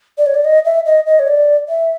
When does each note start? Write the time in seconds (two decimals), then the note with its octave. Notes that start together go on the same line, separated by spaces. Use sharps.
0.18 D5
0.26 C#5
0.34 D5
0.44 D#5
0.65 E5
0.86 D#5
1.06 D#5
1.19 C#5
1.27 D5
1.68 E5